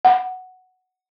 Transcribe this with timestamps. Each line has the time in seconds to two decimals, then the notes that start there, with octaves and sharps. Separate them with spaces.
0.05 F#5